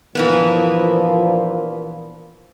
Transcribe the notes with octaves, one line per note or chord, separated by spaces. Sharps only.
G2 A#2 E3 F3 A#3 B3